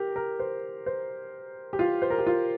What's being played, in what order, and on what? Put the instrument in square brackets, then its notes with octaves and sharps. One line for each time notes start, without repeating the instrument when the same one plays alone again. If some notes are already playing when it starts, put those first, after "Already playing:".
Already playing: [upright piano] G4 A#4
A#4
C5
C5
G4
F4
C5
A#4
G4
F4